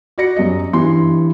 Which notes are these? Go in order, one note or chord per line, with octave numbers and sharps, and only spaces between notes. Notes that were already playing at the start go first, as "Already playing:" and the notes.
F#4 D5 A#6 C#7
F#2 G3 D#5
G2 E3 C6